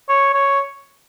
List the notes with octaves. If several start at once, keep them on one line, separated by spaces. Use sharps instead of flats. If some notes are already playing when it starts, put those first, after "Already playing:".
C#5
C#5